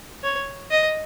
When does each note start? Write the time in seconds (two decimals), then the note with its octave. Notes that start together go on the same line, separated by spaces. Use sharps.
0.23 C#5
0.71 D#5